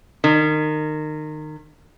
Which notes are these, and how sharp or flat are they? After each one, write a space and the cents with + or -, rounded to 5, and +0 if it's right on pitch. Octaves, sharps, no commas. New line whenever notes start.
D#3 -25